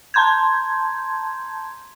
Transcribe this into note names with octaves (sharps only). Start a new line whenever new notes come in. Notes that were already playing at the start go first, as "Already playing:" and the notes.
A5 A#5 C6 G6 G#6